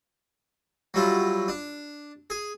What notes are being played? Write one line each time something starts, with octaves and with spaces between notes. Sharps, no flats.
F#3 G3 E4 F4
D4
G#4